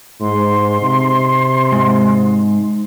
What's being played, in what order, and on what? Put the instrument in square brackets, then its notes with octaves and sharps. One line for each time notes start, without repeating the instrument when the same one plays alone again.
[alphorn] G#2 [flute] C6
[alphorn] C3
[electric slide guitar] G#2